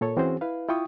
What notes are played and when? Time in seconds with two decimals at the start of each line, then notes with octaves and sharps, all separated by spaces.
0.01 A#2 A4 C#5
0.17 E3 C4 C#4 F#4 G#4 C5
0.41 E4 B4 F5
0.69 E4 F4 G5 C#6 D#6